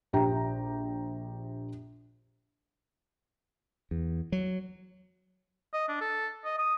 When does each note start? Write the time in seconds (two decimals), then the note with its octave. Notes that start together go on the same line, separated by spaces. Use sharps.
0.13 A#1 G4 G5 A#5
3.91 E2
4.32 F#3
5.73 D#5
5.88 D4
6.01 A4
6.45 D#5
6.59 D#6